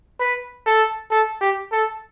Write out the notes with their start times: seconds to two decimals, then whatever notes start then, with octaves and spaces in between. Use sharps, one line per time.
0.20 B4
0.66 A4
1.11 A4
1.41 G4
1.72 A4